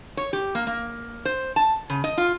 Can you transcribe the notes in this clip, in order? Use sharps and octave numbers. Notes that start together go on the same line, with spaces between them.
C#5
G4
A#3
A#3
C5
A5
C#3
D#5
F4